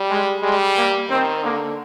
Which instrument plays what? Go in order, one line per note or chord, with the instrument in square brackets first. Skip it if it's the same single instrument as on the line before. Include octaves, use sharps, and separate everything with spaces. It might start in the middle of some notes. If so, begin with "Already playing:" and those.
Already playing: [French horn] G3
[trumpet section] G#3
[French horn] G3 [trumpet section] G#3
[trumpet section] A#3
[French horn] D#3 [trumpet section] C4
[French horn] D3 [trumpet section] A#3